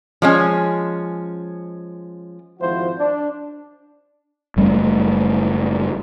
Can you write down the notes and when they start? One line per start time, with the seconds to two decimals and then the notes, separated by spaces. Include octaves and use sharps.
0.22 F3 G#3 C#4
2.60 G#1 F3 E4 F#4 C5
2.98 D4
4.57 F#1 G3 A3 C#4